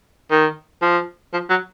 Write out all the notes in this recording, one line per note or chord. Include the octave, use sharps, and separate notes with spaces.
D#3
F3
F3
F#3